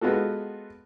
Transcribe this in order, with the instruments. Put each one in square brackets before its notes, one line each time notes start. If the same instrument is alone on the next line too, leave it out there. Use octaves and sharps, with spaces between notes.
[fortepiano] G#3 B3 F4 F#4 A4